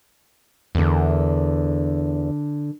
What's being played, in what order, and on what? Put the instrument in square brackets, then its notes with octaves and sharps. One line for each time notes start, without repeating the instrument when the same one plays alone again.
[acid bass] E2 [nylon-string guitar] D3 A#4